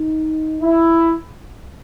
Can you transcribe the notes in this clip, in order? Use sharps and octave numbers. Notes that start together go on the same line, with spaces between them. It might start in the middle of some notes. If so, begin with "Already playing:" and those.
Already playing: D#4
E4